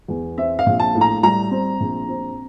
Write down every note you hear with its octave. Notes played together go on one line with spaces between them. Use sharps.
E2
C4 E5
F5
A#1
A5
A2
A#5
G3 A#5
C4
A#1
C4